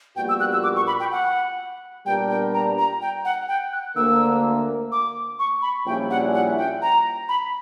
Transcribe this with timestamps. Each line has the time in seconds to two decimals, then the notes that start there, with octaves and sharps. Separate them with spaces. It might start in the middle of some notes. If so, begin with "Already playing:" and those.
0.16 A#1 A#2 G3 B3 F#4 G5
0.29 E6
0.40 F#6
0.52 E6
0.63 D6
0.76 C#6
0.87 B5
1.00 G5
1.12 F#5
2.06 A#2 G3 B3 D4 A#4 G5
2.29 G5
2.54 A#5
2.78 A#5
3.01 G5
3.25 F#5
3.48 G5
3.73 F#6
3.96 D2 D3 A#3 E6
4.92 D6
5.39 C#6
5.62 B5
5.86 A#1 A#2 G3 C#4 E4 G5
6.10 F#5
6.34 F#5
6.58 G5
6.82 A#5
7.29 B5